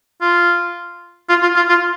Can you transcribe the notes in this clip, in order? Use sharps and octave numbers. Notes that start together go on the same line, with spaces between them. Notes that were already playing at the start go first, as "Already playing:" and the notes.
F4
F4
F4
F4
F4